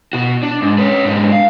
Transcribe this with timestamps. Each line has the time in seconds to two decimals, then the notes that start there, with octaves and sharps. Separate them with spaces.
0.13 B2 F#4
0.43 D4
0.62 G#2
0.78 C#4 B4
1.05 G#2 D4
1.32 F5